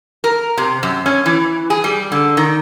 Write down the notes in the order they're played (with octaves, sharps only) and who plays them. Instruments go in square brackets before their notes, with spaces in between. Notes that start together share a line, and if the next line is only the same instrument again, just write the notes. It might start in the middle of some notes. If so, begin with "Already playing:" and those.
[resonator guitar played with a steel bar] A#4
C3
F#2
C#4
E3
G#4
G3
D3
D#3